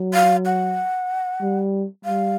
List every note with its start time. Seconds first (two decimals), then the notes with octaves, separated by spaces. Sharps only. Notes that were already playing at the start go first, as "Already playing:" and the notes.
Already playing: F#3
0.14 F5
0.46 F#5
1.41 G3
2.05 G3 F5